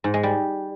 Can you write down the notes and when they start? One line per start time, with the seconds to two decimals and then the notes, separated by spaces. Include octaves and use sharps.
0.04 G#2
0.14 G#3
0.23 G3